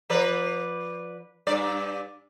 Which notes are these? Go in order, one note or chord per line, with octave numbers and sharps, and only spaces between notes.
F3 B4 D5
G2 D5